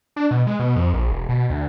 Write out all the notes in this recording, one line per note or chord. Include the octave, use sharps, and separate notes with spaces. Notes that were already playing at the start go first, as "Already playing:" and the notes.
D4
B2
G#3
B2
F2
A#1
E1
B2
D2